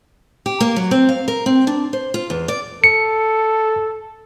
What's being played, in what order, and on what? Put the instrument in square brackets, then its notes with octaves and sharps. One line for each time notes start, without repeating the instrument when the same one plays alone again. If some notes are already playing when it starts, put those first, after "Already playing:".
[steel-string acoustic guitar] G4
A#3
F#3
C4
F5
A#4
C4
D4
C5
F4
E2
D5
[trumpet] A4 [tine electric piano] C#7